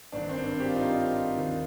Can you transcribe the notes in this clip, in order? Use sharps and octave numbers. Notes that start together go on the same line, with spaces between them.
G#1 G2 D#3 D4
C4
D4
G4
F4
D#4
F4
D#2 D#3